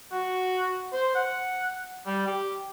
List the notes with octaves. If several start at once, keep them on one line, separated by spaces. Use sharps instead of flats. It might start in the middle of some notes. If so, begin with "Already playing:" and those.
F#4
C5
F#5
G3
G4